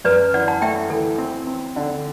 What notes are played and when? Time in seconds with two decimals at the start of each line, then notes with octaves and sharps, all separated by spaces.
0.04 F#2 B4 D5
0.33 E3 D5 F#5
0.48 F#5 A5
0.61 A3 E5 G5
0.90 E3 A4
1.18 C4
1.47 C4
1.76 D3